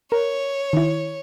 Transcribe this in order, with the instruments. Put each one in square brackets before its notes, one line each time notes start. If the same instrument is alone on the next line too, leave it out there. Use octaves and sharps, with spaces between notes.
[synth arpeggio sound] A#4 [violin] C#5
[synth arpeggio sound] D#3 E4